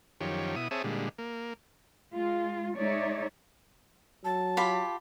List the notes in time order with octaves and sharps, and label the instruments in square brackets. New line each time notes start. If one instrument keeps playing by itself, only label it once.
[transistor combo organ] F#2 D#3 F3 G4 C#5
B2 E4 D#6
C4 G#4 C#5 E5 A5 D#6
A#2 D3 G3 G#3
A#3
[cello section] G#3 F4
G#3 D#4 C#5 D5 E5
[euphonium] F#3 [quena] A5
[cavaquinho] F4 G4 B5